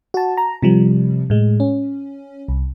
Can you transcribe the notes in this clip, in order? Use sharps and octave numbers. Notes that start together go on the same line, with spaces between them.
F#4 A5
A#5
C3 F3 G3
A2 G#3
C#4
C2